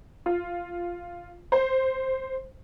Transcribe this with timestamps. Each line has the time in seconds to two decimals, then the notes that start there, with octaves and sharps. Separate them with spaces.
0.26 F4
1.52 C5